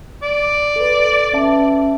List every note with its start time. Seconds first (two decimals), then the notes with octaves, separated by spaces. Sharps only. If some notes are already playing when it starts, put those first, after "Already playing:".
0.23 D5
0.76 A4 B4
1.33 C#4 E5 A5